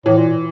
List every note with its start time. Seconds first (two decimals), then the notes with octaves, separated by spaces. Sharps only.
0.06 A2 E3
0.17 A#2
0.28 A#2